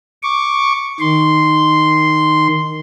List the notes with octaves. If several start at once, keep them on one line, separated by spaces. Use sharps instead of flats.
C#6 D6
D#3 C6